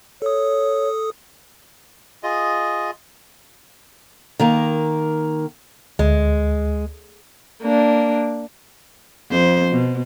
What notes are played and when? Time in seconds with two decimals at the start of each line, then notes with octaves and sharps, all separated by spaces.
0.22 A4 C#5 D#6
2.23 F4 G#4 D#5
4.39 D#3 A#3 A#4
5.99 D2 G#3
7.62 A#3 D4
9.30 F2 C5
9.72 B2